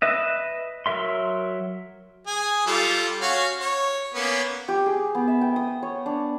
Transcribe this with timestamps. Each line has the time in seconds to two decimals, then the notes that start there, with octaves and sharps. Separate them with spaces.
0.02 B4 D#5 E5
0.86 F#3 A#4 E5 C6
2.27 G#4
2.66 G3 F4 A4
3.21 C#4 F#4 F5
3.60 C#5
4.14 A#3 B3 C#4
4.68 G4
4.86 G#4
5.15 B3
5.28 E5
5.41 G5
5.56 D#6
5.82 C#5
6.06 D4